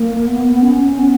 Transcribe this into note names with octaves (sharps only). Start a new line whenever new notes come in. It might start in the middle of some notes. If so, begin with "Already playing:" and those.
Already playing: A#3
B3
C#4
B3